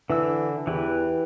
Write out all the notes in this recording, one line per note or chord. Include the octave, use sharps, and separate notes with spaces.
D3 E3 E6
E2 E3 G4 B4